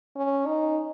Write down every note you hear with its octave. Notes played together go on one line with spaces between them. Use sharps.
C#4
D#4